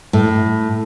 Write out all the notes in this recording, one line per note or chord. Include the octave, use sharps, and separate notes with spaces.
A2